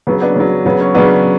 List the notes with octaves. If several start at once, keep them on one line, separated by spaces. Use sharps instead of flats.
C#3 F#3 B3
B3 D4
C#3 F#3
C#3 F#3 B3
C#4
C#3 F#3 B3 D4